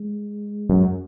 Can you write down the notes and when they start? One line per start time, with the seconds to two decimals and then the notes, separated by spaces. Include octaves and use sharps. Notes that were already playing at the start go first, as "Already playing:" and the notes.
Already playing: G#3
0.69 F#2